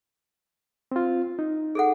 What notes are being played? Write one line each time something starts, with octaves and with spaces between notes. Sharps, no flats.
C4 F4
D#4
G#4 A4 F#5